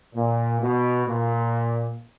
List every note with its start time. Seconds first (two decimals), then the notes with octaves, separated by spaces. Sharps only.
0.15 A#2
0.61 B2
1.08 A#2